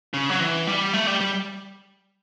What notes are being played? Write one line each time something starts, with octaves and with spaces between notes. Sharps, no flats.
C#3
F#3
E3
G3
A3
G3
G3